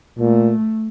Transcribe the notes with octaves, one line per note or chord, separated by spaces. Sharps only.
A#2 A3